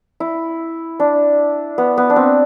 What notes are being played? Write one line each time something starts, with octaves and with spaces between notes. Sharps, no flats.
E4
D4
B3
B3
D4
C4